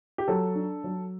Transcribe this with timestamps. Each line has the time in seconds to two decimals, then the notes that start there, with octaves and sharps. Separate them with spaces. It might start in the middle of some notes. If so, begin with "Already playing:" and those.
0.18 G4
0.28 F#3 A4
0.55 D4
0.84 F#3